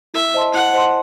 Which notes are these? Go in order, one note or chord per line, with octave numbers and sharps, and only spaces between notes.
E4 E5
C5 D#5 A5 C6
E4 F#5
C5 D#5 A5 C6